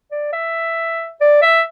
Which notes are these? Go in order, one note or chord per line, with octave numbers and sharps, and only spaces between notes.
D5
E5
D5
E5